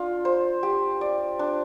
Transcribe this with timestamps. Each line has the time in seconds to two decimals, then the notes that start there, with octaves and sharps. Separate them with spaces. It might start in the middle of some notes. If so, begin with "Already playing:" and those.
Already playing: D4 F4
0.25 C5
0.63 G4
1.01 D5
1.39 D4